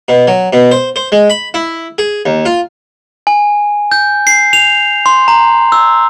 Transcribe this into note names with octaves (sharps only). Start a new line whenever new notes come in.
B2
F#3
B2
C5
C5
G#3
B5
E4
G#4
D#2
F4
G#5
G6
C7
F7
C6
A#5
E6